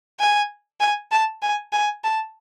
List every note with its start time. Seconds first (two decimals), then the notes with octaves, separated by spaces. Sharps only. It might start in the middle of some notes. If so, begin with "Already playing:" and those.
0.20 G#5
0.80 G#5
1.11 A5
1.43 G#5
1.73 G#5
2.04 A5